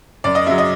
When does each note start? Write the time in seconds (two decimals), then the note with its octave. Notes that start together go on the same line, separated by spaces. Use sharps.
0.24 F#2 D5
0.35 D#5
0.47 C#3 F#3 E5
0.58 D#5